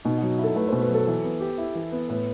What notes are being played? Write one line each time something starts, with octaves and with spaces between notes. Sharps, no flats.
B2 D#4
F#3 F#4
E4 A4
A3 B4
B2 C5
B4
F#3 A4
E3
B3
G4
E4
E3
B3
A2 B4